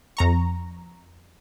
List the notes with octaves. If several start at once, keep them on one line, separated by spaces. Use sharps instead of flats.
F2 A#5 C#6